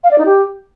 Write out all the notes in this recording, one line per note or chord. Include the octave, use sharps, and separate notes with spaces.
F5
D5
D#4
G4